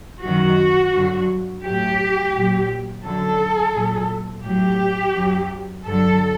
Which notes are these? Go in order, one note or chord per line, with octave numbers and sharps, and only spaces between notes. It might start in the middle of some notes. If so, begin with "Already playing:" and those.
F#2 D#3 F#3 F#4
G2 D3 F#3
A2 F#3 G4
A#2 F#3
F#2 D3 F#3 A4
A#2 F#3
A2 F#3 G4
F#2 F#3
G2 D3 F#3 A4